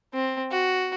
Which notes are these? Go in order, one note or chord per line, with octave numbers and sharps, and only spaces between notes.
C4
F#4